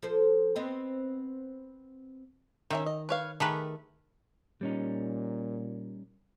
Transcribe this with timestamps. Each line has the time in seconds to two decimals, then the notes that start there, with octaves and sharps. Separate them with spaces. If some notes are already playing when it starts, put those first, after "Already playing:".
0.03 F3 A4 C5
0.56 B3 C4 D#5
2.70 D#3 C#4 E5 G5
2.86 D#5
3.09 B4 C#5 F5
3.40 D#3 A3 G4 G#4 A#4 B4
4.61 A#2 G3 C#4 D#4